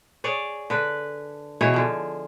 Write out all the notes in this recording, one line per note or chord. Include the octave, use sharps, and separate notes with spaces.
G#4 C#5 D5
D3 B4
B2 E3 G#4 C#5
D3 F3